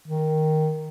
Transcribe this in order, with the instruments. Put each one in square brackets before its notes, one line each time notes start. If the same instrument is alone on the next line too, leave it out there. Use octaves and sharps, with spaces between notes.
[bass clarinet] D#3